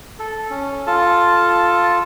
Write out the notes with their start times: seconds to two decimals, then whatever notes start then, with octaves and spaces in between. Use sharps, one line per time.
0.19 A4
0.50 C#4
0.87 F4 A4 A5